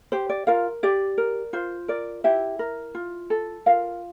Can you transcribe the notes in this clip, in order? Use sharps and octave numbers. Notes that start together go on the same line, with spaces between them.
G4 C5
D5
F4 A#4 F5
G4 D5
A#4
F4 C5
A#4 D5
E4 G4 E5
A#4
F4
A4
F4 A#4 F5